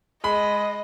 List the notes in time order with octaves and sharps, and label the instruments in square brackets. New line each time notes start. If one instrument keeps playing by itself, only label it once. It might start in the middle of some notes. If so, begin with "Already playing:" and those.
[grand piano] G#3 B5 [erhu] D#5